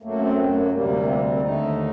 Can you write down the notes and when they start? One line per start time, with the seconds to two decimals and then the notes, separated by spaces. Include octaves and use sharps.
0.02 F#2 F#3 A3 A#3
0.19 C4
0.37 A3
0.54 A#3
0.71 D2 C3 G3 A#3
0.88 A#3
1.06 C4
1.18 C4
1.29 C4
1.40 D#2 D3 A3 D#4